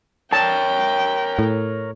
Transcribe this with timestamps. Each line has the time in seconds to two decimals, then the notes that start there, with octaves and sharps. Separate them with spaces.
0.33 A#4 C#5 G5 A5
1.39 A2